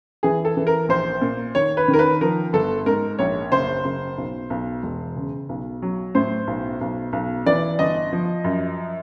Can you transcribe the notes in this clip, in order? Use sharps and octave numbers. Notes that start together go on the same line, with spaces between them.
E3 G#4
A4
E3
A#4
A#1 C5
A#2
D#3 C#5
B4
D#3
A#4
B4
F3 A#4
G1 A4
G#2 A#4
A#1 C#5
F#1 C5
F#1
B1
B1
E1
C#3
B1
F#3
A2 C5
B1
B1
B1
E3 D5
G1 D#5
F3
F#2